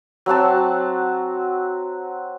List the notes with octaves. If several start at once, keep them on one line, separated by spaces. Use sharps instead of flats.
F#3 C4 F#4 A5